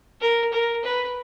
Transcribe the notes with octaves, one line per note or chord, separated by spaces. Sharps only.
A#4
A#4
B4